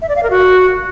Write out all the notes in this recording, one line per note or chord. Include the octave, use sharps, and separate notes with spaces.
E5
D5
F5
A#4
F#4